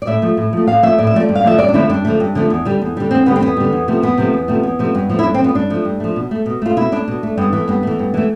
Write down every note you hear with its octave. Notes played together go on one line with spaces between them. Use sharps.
D5
A2 E5
F3 A3
A2
F3 A3
A2 F5
F3 A3 E5
A2 D5
E5
F3 A3 D5
G2
F5
D3 F3 A3 E5
G2 D5
D4
D3 F3 A3 E4
G2 D4
D3 F3 A3
G2
D3 F3 A3
E2
D3 G3
E2
D3 G3
E2 C4
D3 G3 B3
C4
E2 B3
D3 G3
E2
C3 F3 A3
E2 B3
C3 F3 A3
E2
C3 F3 A3
E2
C3 F3 A3
G2
F3 A3
E4
G2 D4
C4
F3 A3 B3
G2 D4
F3 A3
G2
F3 A3
B2
A3
B2
A3 F4
B2 E4
A3 D4
B2
A3
G2 B3
E3 A3
G2 B3
E3 A3
G2
E3 A3